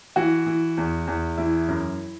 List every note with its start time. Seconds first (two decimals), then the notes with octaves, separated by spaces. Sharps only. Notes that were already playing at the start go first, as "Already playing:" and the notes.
0.16 E3 F#4
0.46 E3
0.77 E2
1.07 E2
1.37 E3 E4
1.68 F#2